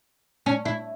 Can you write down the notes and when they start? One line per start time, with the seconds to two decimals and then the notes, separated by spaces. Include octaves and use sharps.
0.46 C#4
0.65 E4